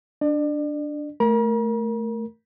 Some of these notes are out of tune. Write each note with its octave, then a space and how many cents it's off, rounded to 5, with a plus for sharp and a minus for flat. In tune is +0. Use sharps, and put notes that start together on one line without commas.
D4 +0 D5 +35
A3 +0 A#4 +0 A#5 +45